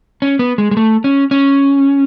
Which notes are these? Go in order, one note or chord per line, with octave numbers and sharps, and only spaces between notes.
C#4
B3
G#3
G#3
A3
C#4
C#4